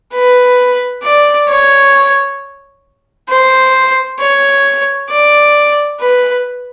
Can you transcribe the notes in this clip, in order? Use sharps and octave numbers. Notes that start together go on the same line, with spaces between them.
B4
D5
C#5
C5
C#5
D5
B4